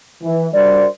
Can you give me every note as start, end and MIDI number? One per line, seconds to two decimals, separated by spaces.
0.23 0.47 52
0.54 0.86 55
0.54 0.86 62
0.54 0.86 66
0.54 0.86 70
0.54 0.86 72
0.54 0.86 74